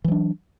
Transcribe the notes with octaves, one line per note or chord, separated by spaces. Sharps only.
E3 F#3 D4